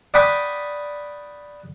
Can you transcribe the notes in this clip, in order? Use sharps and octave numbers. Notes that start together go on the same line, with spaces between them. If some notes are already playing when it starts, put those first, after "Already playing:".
D5 F#5 G5 B5 C#6 D#6